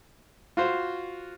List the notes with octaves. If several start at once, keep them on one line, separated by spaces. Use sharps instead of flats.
F4 F#4 C5